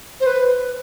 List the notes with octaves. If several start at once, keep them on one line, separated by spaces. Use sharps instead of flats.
C5
B4